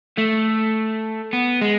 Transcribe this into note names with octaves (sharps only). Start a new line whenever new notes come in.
A3
B3
G#3